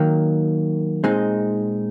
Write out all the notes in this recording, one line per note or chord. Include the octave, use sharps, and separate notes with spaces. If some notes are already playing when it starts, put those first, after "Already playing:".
Already playing: D#3 F#3 A#3
A#2 G#3 C4 D#4